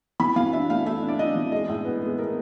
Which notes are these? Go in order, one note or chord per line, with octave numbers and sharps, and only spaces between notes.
E3 B5
E3 F5
D4 E5
A3 F5
A3 E5
D4
D5
D4 D#5
E3
G#3 D#5
A2
B3
G#3
G#3 A#4